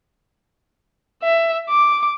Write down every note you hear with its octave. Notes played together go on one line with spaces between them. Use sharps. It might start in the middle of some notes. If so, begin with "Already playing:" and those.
E5
D6